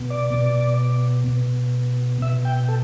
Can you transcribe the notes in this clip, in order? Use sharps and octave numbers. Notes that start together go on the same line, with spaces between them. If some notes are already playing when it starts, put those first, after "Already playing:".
Already playing: B2
D5
B2
B2
B2 E5
G5
A4